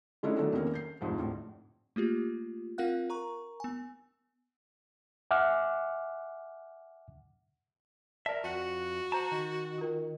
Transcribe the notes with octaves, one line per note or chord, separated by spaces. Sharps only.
D3 G#3 A3 C#4 D#4 E4
D3 D#3 F#3 A3 D4 A4
E2 D#3 A#3 C#4
G6 C7
F1 C2 G#2 F3
D2 A2
A3 A#3 F4 G4
C4 F4 A#4 F5 F#5 F#6
A#4 A#5 C#6
B3 G#5
E5 F#5 G#5 D6 F6 F#6
A#4 D5 E5 A5
F2 F#4 F#5
C5 A5 A#5
D#3
F4 A#4